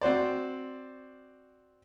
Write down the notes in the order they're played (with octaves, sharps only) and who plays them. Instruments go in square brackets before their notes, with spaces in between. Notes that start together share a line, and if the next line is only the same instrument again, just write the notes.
[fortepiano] C4 F#4 C5 D5